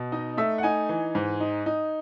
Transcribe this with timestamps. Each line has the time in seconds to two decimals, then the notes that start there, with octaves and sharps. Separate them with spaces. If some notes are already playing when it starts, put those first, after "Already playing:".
Already playing: B2
0.12 D#4 D#5
0.37 A3 E5
0.58 F#5
0.63 D#4 G#5
0.89 E3
1.15 G#2
1.40 D#4
1.66 D#4